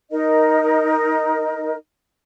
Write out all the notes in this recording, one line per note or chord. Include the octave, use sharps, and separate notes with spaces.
D#4 A#4 D#5